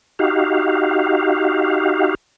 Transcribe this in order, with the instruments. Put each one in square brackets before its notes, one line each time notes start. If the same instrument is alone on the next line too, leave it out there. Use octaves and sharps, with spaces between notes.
[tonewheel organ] D#4 F#4 G4 F5